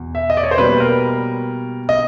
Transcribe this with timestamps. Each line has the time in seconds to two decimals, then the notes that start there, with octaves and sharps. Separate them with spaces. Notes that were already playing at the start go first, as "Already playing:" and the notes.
Already playing: E2 B2
0.15 E5
0.30 D#5
0.37 D5
0.43 C#5
0.51 C5
0.58 B2 G3 A#3 B4
0.80 A#4
1.89 D#5